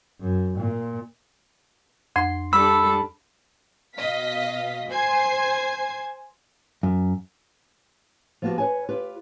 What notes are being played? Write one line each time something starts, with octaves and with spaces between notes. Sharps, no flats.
F#2
A#2
F2 C6
G3 D4 A4 B5 E6
B2 D#5 F5 B6
C5 G#5 G#6 C7
F#2
F3 A#3 B3 D#4 F#4 G4
B4 C#5 G#5
F4 G4 B4